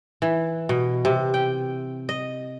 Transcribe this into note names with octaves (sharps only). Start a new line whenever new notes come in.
E3
B2
C3
G5
D#5